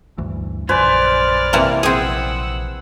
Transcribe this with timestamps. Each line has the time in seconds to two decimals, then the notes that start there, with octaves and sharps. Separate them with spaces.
0.18 D2 G2 E3
0.69 A#1 F#2 B4 C5 D5 G#5 F6
1.53 C3 E3 A#3
1.83 A#1 C4 G#4 F#5 E6